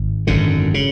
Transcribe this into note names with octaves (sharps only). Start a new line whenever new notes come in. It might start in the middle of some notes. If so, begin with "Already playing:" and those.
Already playing: G#1
G#1 F#2 D3
C#3